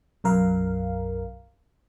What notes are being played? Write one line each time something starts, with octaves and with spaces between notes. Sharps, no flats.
B1 F#2 A#4 F5